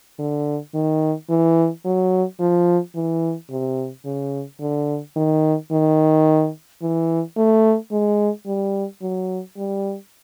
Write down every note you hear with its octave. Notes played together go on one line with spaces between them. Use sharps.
D3
D#3
E3
F#3
F3
E3
C3
C#3
D3
D#3
D#3
E3
A3
G#3
G3
F#3
G3